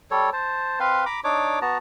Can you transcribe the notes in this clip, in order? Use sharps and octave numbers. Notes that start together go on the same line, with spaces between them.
G3 A4 C#5
C5 A5
C4 B4 F5 C6
A#5 B5 D6
D4 D#4 C#5 D6
B3 F#4 A5 A#5